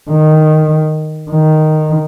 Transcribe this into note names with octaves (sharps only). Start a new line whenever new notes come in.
D#3
D#3